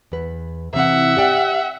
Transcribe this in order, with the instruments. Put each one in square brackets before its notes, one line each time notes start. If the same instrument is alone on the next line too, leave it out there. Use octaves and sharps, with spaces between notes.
[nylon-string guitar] E2 B4
[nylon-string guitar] C3 E3 C4 [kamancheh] E5 F#5
[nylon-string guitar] G4 D5 G5